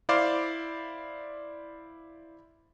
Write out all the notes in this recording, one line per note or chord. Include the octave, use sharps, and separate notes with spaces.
E4 C5 D5 F5 D6